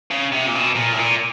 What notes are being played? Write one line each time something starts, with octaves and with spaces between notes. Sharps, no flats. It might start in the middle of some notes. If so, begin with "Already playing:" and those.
C#3
C3
A#2
B2
A#2
A2
A#2